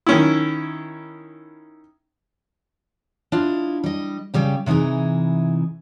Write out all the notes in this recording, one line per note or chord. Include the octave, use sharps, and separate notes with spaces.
D#3 C#4 E4
D4 E4 F4 D#5
G3 D#5
C#3 G3 G4 G5
C3 E3 D#4 E4 G#4